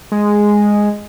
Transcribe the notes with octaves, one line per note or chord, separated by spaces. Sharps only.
G#3